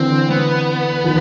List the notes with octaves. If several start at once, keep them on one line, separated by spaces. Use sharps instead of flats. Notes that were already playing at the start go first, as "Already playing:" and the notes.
Already playing: D3 E3 C4
B3
D#3 F3